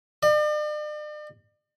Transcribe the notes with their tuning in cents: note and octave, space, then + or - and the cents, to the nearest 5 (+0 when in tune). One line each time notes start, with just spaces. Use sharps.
D5 +45